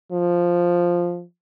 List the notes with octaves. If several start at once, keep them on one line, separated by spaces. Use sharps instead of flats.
F3